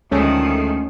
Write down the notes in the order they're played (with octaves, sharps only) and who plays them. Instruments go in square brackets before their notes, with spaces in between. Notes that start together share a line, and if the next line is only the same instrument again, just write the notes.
[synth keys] D2 G#3 A3 [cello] D#3 F3 [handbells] C#4 C#5